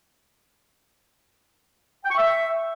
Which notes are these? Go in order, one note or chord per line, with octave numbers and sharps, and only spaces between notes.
G5
C#6
E5